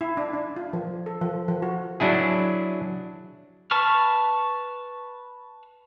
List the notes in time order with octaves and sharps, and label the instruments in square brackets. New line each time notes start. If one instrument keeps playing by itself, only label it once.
[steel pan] E4
D4
D4
F4
F3
A4
F3
F3
F#4
[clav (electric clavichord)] F#3 D4 E4 G#4
[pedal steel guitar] B4 A5 C#6 F6